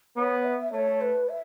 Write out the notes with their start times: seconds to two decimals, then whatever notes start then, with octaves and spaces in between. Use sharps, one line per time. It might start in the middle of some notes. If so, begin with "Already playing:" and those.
0.16 B3 C#5
0.45 E5
0.72 A3 C#5
1.01 B4
1.29 E5